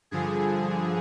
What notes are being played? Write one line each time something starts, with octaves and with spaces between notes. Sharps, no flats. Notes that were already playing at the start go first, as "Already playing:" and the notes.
G2 D3 F3 G#4